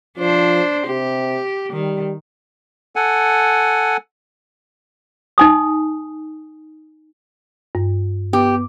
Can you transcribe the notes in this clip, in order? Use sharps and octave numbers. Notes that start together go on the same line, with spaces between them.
F3 D4 C5
C3 G4
D#3 G3
A4 F#5 G#5
D#4 G#5 D#6
G2
B3 G4